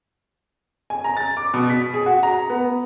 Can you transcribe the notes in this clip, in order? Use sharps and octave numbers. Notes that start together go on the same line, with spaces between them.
G#5
A#5
A6
D6
B2
B6
G#4
F#4
A#5
B3